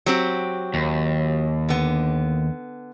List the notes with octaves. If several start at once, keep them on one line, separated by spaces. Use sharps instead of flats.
F#3 C4 G4
D#2
D3 B3